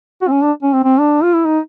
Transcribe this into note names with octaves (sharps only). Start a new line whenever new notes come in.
F#4
C4
C#4
D4
C#4
C4
C4
D4
F4
E4
D#4